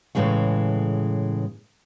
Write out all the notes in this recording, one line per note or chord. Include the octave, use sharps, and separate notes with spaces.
A2 C#3 E3 G#3 A3